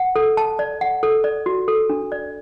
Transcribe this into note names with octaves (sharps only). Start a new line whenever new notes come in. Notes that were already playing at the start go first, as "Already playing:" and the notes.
Already playing: F#5
A4
A5
D5
F#5
A4
D5
F#4
A4
D4
D5